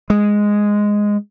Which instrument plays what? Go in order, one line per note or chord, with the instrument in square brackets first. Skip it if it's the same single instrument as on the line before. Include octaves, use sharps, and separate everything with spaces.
[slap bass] G#3